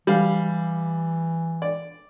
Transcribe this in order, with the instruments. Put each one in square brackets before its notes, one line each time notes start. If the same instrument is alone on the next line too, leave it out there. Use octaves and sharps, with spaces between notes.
[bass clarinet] E3 [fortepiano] G3 F5
[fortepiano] D5